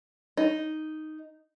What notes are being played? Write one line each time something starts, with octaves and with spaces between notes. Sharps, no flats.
D#4